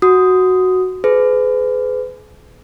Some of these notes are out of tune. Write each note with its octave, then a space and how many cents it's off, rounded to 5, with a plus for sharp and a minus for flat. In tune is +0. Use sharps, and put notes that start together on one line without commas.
F#4 +0 D#6 +0
G#4 +35 B4 +40